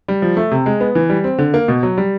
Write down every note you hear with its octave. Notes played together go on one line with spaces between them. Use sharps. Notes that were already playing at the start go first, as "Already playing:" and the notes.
G3
F3
A3
C3
G#3
B3
E3
G3
C4
D3
A#3
B2
F#3
G3